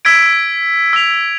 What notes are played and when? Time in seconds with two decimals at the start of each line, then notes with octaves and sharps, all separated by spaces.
0.05 E6 G#6 B6 D7
0.93 E6 B6 F7